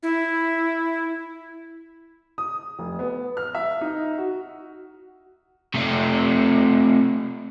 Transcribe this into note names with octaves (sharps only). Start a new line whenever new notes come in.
E4
D#6
F1
B3
F6
E5
D#4
F#4
C3 A3